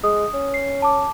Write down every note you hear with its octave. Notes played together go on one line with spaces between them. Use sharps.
G#3 D#6
C#4
C7
A5 D6